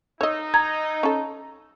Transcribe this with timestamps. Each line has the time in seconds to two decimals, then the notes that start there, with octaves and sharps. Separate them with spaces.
0.21 D#4 C#5 D#5 E6
0.54 A#5 G#6
1.03 C#4 A4